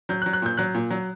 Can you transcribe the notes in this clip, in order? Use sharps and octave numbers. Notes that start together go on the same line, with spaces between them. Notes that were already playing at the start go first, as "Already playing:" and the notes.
F#3 G6
F#6
F#3
F#6
A#2 G6
F#3 F#6
A#2
F#3